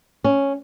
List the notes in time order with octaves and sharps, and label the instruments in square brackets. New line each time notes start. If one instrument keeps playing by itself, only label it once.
[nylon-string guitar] C#4